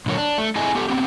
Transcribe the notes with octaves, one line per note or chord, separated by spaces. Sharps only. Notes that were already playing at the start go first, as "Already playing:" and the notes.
A#2 D3 F#3 A#4 C#5
D4
A3
C4 E4 G#4 A4 D#5 G#5
B3 G4 A4
B3 C4 G4